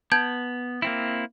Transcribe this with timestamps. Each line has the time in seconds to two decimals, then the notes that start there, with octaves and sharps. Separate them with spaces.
0.12 B3 A5 G6 G#6
0.82 A#3 C4 E4